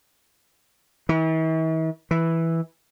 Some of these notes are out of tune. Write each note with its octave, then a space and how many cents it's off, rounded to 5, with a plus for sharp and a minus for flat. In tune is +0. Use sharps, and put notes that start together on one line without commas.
E3 -45
E3 -5